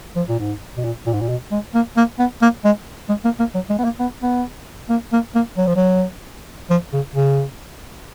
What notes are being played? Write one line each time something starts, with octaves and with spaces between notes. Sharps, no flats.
F3
A#2
G#2
B2
A#2
A#2
G#2
A#2
B2
G#3
A#3
A#3
B3
A#3
G#3
G#3
A#3
A#3
F#3
G#3
B3
A#3
B3
B3
A#3
A#3
A#3
F#3
F3
F#3
F3
C#3
C#3